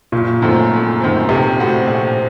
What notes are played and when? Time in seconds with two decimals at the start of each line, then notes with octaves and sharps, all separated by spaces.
0.12 F#1 A#2
0.42 F#2 D#3 A3 C4
0.71 F#1
1.00 F#2 D#3 A3 C4
1.29 A#1 C3
1.58 A2 A3 C4 F#4
1.87 A#1